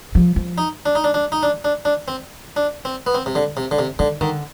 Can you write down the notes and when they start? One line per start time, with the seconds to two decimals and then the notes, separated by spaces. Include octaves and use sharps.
0.15 F3
0.36 F3
0.58 D#4
0.86 D4
0.95 D#4
1.04 D4
1.14 D4
1.32 D#4
1.43 D4
1.65 D4
1.85 D4
2.08 C4
2.56 D4
2.85 C4
3.07 B3
3.14 C4
3.26 C3
3.35 D3
3.57 C3
3.71 D3
3.79 C3
3.99 D3 D#3
4.21 D3 D#3